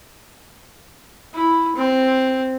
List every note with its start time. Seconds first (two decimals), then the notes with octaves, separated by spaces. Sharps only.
1.33 E4
1.76 C4